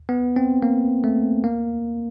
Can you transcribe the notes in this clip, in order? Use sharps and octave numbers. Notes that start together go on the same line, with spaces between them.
B3
C4
A#3
A3
A#3